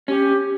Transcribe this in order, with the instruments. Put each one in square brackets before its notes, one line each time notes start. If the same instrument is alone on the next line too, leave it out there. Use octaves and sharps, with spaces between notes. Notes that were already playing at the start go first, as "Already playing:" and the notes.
[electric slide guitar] C#4 [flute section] G4